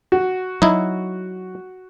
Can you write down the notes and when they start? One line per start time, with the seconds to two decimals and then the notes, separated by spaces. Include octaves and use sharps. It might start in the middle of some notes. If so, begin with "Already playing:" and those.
0.12 F#4
0.62 F#3 D#4 E4